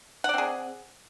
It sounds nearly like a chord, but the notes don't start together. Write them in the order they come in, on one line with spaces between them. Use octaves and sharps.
F#5 D5 C4 G#4